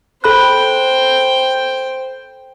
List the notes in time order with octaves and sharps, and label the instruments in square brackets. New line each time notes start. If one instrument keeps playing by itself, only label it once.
[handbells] A4 B5 F#6 [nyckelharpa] C5 G5